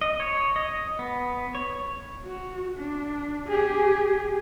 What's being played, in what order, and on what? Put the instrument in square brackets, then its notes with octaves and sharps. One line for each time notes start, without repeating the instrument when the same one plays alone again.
[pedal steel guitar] D#5
C#5
D#5
B3
C#5
[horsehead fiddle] F#4
D4
G4 G#4